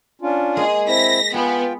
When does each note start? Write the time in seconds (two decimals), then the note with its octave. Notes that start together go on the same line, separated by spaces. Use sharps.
0.22 C#4 D4 F4
0.57 G#3 A#3 G#4
0.87 C4 E4 A#6 B6
1.34 B3 F4 G#4 G5